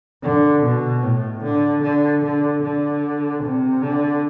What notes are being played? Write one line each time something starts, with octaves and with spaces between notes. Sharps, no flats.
D3
B2
A2
D3
D3
D3
D3
C3
D3